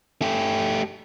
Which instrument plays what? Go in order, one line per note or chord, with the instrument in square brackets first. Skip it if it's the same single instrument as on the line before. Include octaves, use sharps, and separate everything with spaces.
[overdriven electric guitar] A3 G4